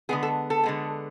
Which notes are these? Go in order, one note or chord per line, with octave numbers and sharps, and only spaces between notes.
D3 G#3 B3 G#4
A4
A4
D3 G#3 B3